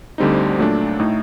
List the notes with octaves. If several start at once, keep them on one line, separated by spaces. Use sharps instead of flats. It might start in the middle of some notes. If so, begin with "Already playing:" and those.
D2 D3 G3 C4 D#4
A#2 F#3 A3 D4
A2 A3 D#4